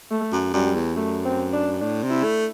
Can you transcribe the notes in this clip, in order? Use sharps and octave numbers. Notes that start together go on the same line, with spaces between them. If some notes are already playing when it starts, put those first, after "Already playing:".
A3
F#2
F#2 G3
E2
F#2 A3
C4
D4
A2 D4
C3
E4
A3